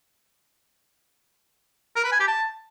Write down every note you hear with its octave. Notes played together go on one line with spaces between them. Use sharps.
A#4
B4
G#5
G4
A5